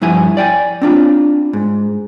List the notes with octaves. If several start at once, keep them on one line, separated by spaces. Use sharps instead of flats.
G2 F3 E4 F#5 G#5
D5 G5 G#5
C4 D4 F4
G#2